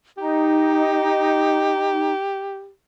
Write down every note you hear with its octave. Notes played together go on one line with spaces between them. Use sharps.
D#4 G4